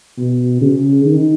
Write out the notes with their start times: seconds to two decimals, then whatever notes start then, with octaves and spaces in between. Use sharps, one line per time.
0.18 B2
0.61 C#3
1.05 D#3